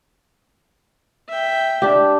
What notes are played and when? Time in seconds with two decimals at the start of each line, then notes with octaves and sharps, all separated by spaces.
1.29 E5 G5
1.82 D4 G4